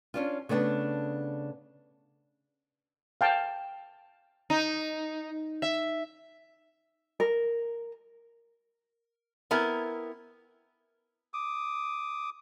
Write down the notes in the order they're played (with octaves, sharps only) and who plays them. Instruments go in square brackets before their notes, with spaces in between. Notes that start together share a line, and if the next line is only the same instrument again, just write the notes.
[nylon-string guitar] C#4 D4 F4
C#3 A3 B3 D4 A5
[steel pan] F5 G5 A5
[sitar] D#4
E5
[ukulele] A#4
[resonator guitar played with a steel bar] B3 C4 E4 A#4 G#5
[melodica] D6 D#6